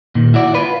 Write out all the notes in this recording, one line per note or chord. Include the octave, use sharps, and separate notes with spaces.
A#2 D#3
E4 F#4 D5
F4 B4